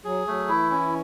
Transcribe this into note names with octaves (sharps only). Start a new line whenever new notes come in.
F#3 G#4
F#3 A3
E3 E4
C#4